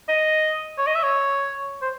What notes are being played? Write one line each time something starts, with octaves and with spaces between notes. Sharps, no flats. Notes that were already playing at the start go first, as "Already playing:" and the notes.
D#5
C#5
D#5
E5
C#5
C5